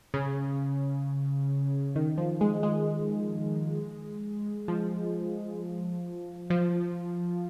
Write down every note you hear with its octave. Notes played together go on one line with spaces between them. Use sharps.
C#3
D#3
F3
G#3
G#3
F3
F3